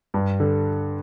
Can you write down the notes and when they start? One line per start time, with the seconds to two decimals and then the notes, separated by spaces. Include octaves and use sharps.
0.14 G2
0.40 D3